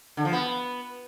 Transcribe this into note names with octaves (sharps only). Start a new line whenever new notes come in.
D3
F3
B3